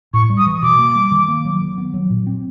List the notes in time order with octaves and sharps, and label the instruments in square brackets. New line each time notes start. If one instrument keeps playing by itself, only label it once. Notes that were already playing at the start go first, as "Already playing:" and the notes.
[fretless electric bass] A2 [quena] C#6
[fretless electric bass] G3
[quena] D#6
[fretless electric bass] E3
[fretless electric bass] B2 [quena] D6
[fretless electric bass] A#3
G3
D#3
A#3
F#3
D#3
B3
F#3
A#2
C4